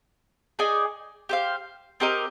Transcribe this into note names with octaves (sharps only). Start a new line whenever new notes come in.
D#4 G#4 D5 G#5
G4 C5 F5
C4 G4 A#4 D#5